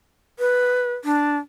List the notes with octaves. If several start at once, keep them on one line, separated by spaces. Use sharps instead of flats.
B4
D4